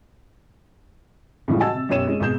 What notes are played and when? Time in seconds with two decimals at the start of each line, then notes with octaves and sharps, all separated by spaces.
1.48 A2 C#3 E3 F3 G3 G#3
1.60 F#4 D#5 G#5 A5 E6 A6
1.74 C3
1.89 F#2 B2 G4 C#5 D#7 E7
2.07 G#3 C#4
2.20 G#1 B2 G#4 G6 E7